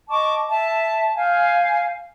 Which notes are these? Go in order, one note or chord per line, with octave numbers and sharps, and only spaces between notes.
D#5 A5 C#6 D6
E5 A5
F5 G#5 G6